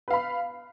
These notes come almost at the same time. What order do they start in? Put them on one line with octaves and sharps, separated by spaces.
B4 F5 B5